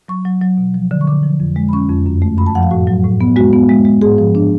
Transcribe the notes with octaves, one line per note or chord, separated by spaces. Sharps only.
F#3 C#6
F#3
F#3
B2
F3
D3
C#6
D3 D6
F3
F2
G#3
B5
C#4 C#6
F2
F#2
A3
F#2 B5
A5
F3 F#5
F5
A2 F#4
F#3
A2
B3
G#3 F#4
B3
G#3
G#3
G#2 G#4
F3
D4